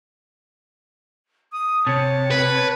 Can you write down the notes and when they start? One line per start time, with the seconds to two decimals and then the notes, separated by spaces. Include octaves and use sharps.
1.52 D#6
1.87 C3 C#5 A5
2.31 B4